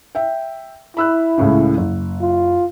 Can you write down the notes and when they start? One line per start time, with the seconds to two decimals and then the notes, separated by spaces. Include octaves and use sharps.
0.15 E5 G5
0.97 E4 B5 E6 F#6
1.38 C#2 A2 C#3
1.77 F#1
2.21 F4